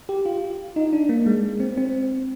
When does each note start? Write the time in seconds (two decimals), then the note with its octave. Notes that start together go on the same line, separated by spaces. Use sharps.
0.09 G4
0.26 F4
0.76 D#4
0.93 D4
1.09 A#3
1.26 G#3
1.60 C4
1.77 C4